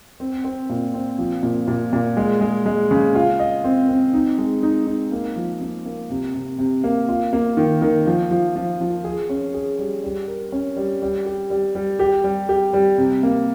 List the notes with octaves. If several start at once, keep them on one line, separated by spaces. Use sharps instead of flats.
C4
C4
A#2
C4
F3
A#2
A#2
A#2
G#3
G#3
G#3
C#3
F4
D#5
C4
C4
D#4
G#3
D#4
D#4
A#3
F3
A#3
A#3
C3
C3
C3
A#3
F4
A#3
D#3
D#3
F3
F3
F3
F3
G#4
C#4
G#4
G3
G3
A#4
C#4
G3
G3
G4
G3
G3
G4
G3
G4
G3
C3
A#3